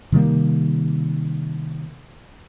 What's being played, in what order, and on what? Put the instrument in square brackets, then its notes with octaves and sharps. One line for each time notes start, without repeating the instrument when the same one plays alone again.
[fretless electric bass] C3 D#3 G3 A#3